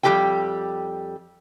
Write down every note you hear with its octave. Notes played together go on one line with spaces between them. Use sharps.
F2 G3 G#3 G4 A4 G5